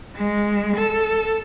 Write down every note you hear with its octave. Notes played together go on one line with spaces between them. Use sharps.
G#3
A4